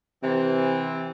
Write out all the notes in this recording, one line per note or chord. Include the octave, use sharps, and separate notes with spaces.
C3 E3 C4